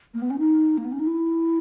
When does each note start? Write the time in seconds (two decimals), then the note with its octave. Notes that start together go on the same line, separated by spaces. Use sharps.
0.14 A#3
0.22 B3
0.30 C#4
0.38 D#4
0.77 A#3
0.84 B3
0.92 C#4
0.99 D#4
1.07 E4